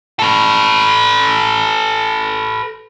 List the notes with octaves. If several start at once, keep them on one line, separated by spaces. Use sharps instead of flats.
A4 B4